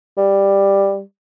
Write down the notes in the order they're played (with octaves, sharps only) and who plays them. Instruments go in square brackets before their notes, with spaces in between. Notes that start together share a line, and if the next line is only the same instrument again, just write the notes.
[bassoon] G3